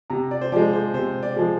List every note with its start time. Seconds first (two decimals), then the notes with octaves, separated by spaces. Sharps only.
0.10 C3 A#5
0.31 D5
0.41 C5
0.52 F3 D5
0.56 G#3
0.73 C5
0.94 C3 C5
1.23 D5
1.36 F3 G#3